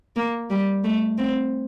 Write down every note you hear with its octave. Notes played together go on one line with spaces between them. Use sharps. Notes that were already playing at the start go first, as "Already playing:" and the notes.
A#3
G3
A3
C4